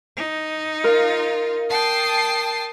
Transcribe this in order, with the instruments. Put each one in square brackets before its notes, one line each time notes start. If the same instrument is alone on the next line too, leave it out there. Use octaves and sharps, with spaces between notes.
[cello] D#4
[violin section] F4 [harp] A#4
[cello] G5 [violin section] A5 D#6 C7